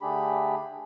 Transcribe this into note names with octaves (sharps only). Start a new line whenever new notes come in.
D3 A3 D4 G4 G#4 B5